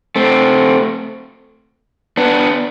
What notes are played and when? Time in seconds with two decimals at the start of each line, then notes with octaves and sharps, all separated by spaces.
0.16 A3 C4
2.17 B3 D4